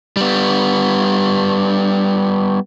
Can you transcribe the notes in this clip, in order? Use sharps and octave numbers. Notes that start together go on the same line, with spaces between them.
G3 B3